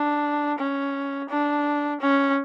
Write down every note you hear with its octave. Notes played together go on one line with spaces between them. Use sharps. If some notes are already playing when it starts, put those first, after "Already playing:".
Already playing: D4
C#4
D4
C#4